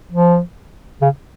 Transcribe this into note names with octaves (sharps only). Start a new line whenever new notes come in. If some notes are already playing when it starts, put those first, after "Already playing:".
F3
C#3